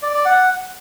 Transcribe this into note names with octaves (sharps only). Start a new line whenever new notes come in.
D5
D5
F#5